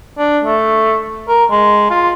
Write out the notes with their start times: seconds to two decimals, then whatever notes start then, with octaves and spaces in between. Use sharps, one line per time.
0.18 D4
0.44 A3
1.28 A#4
1.50 G#3
1.90 F4